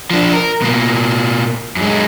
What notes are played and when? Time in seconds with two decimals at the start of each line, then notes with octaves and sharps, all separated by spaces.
0.11 F3 D4
0.33 A#4
0.62 B2 A#3
1.76 F#2 G#3